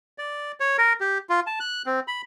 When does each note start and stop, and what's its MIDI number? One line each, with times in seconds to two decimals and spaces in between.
0.18 0.52 74
0.60 0.77 73
0.78 0.93 70
1.00 1.18 67
1.29 1.40 65
1.47 1.59 81
1.60 1.82 90
1.86 2.00 60
2.08 2.22 83